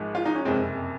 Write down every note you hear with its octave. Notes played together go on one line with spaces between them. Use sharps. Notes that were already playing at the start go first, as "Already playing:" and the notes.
Already playing: G#1 G#2 F3 G#3
F4
D#4
C#4
F#1 F2 C3 G#3 C4